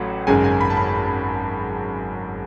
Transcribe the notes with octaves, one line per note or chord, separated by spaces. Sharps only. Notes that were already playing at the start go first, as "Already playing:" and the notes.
Already playing: A1 A2 F#3 A3 F#5
G#1 F#2 C#3 G#3 G#5
G#5
B5
A5
B5